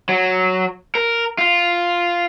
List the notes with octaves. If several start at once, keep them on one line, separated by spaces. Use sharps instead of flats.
F#3
A#4
F4